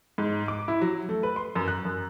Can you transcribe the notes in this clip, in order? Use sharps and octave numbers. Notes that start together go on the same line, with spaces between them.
G#2
D6
E4
F#3
A3
B4
C6
F#2
F#6
F#2